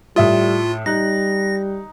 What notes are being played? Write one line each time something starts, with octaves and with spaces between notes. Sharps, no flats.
A2 G3 F4 E5 D#6
G3 D#4 F#6 A#6